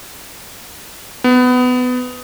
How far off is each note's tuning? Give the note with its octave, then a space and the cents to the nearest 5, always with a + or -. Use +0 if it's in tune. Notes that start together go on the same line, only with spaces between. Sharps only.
B3 +20